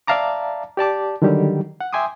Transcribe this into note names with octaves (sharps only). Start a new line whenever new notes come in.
D5 E5 F5 A5 A#5 D6
G4 D5 A5 D6
D3 D#3 F#3 G3 G4
F#5
E5 G5 G#5 C6 D6 D#6